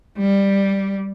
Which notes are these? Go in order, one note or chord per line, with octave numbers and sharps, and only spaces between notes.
G3